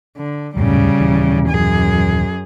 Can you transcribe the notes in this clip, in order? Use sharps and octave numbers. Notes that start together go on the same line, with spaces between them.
D3
D#1 F#2 A2 C#3 G3
D#1 E3
F#2 G#4